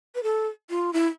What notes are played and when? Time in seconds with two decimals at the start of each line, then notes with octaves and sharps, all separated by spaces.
0.15 B4
0.23 A4
0.70 F4
0.93 E4